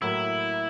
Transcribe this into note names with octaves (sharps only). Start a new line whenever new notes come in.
A2 F#3 A#3 E4